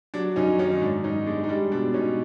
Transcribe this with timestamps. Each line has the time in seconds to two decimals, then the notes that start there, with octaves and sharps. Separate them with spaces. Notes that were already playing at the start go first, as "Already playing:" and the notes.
0.14 F#3 D4
0.36 F#2 C#4 D#4
0.59 D#3 C#4 D#4
0.82 G#2 D4
1.04 G#2 C#4 D#4
1.27 G#3 D4
1.44 D#4
1.49 G3 D4
1.72 B2 D4
1.94 B2 C#4 D#4